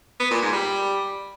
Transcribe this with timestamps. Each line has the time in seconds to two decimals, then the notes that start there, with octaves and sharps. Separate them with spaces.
0.20 B3
0.30 A#2
0.41 G#2
0.52 G3